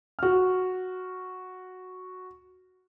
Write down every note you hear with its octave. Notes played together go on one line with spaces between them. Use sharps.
F#4 F6